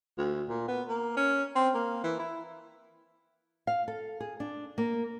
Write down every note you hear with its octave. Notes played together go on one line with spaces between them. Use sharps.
D2
A#2
B3
A#3
C#4
C4
A#3
E3
E4
F5
A4
G#4
D4
A#3